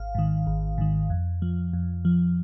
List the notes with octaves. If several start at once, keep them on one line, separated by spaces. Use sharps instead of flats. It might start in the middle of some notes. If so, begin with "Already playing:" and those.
Already playing: G#1 F5
G#2 D#3
G#1
G#2 D#3
F2
F3
F2
F3